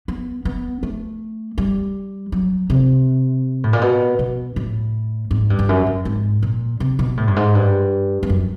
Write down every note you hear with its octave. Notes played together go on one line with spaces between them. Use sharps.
B3
B3
A3
G3
F#3
C3
A2
A#2
B2
B2
A2
G#2
G2
F2
F#2
F#2
G#2
A#2
C3
B2
A2
G2
G#2
G2
G2
F#2